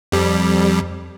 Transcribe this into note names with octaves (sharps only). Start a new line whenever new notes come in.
F2 G3